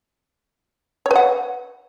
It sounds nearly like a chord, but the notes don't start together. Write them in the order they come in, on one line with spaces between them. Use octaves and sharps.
C#5 B4 F#5